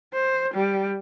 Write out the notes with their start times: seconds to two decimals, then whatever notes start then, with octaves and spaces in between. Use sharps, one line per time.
0.14 C5
0.54 G3